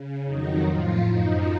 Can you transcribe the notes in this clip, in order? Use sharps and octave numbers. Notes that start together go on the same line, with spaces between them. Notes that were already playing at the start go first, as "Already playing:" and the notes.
Already playing: C#3
F2 D#3 F#3 D#4
A2 F3 F4
F#2 F3 D#4